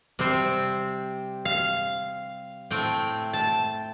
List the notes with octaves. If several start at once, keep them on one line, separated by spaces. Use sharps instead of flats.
C3 G3 C4
F5
A2 A3 C4 G5
A5